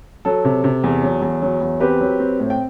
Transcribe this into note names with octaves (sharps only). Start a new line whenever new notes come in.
F#3 A4
C3
C3
E2
F#3
E2
F#3
E2
C4 G4 B4
F#3
C4
A2
G5